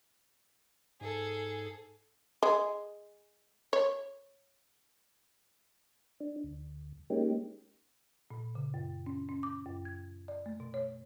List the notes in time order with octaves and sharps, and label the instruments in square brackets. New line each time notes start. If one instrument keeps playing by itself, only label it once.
[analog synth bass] G#2 [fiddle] G#4 A4
[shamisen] G#3
C#5
[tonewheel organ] D4
D2
G#3 A#3 C#4 D#4 G4
[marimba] A#2
C#3
F#2
C#4
C#4
D6
F#2
G#6
D5
A3
B2
C#5